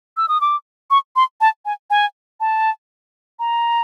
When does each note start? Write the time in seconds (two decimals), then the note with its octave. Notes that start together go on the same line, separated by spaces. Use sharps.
0.17 E6
0.28 D#6
0.41 D6
0.91 C#6
1.16 C6
1.41 A5
1.65 G#5
1.90 G#5
2.40 A5
3.39 A#5